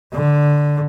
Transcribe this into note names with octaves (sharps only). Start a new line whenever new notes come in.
D3